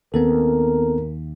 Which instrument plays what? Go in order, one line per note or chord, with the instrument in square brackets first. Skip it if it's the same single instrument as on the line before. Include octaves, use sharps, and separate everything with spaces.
[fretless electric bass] D#2 [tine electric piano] B3 C4 A4 [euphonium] A#4